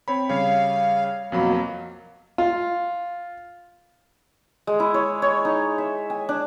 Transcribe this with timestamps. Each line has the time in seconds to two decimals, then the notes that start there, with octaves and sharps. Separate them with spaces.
0.08 C4 C#5 B5
0.29 C#3 G3 C#5 F5
1.32 F2 B2 F#3 A#3 B5
2.38 F4
4.67 G#3
4.80 E4
4.94 C#5
5.22 C#5
5.45 D#4
5.78 E5
6.10 G#5
6.29 D4